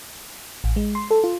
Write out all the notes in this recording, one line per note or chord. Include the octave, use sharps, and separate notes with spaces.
A1
G#3
C6
A4
F4